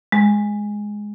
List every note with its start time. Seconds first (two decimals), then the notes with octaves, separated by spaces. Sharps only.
0.12 G#3